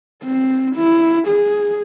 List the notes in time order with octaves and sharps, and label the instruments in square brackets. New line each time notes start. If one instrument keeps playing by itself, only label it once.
[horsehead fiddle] C4
E4
G#4